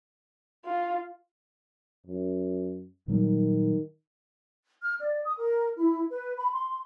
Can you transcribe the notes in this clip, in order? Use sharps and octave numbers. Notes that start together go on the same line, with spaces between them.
F4
F#2
A#2 D#3 F#3 G3
F6
D5
D#6
A#4
E4
B4
B5
C6